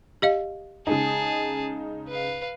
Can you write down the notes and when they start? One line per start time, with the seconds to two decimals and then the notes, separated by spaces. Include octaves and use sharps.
0.22 G4 D#5 F5
0.87 C#3 G#3 D#4 G#4 A5
2.08 B4 F5